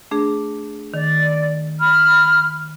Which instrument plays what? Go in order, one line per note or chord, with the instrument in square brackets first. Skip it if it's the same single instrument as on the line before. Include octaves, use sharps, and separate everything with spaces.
[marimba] A3 D4 G#4
[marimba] D#3 [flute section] D5
[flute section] B5 F6